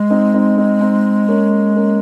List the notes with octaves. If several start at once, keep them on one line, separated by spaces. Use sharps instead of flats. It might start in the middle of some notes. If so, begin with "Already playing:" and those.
Already playing: G#3
C4 D#4
C4 D#4
C4 D#4
C4 D#4
A#3 C#4
A#3 C#4